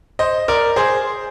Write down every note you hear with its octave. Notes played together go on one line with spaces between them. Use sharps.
C5 D#5
A#4 D5
G#4 C5